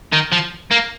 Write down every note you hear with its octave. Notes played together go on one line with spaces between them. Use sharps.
D#3
F3
A#3